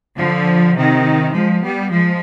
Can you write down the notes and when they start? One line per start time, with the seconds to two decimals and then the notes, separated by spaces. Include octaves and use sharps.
0.17 D3 F3
0.76 C3 D#3
1.33 F3 G#3
1.62 G3 B3
1.91 F3 G#3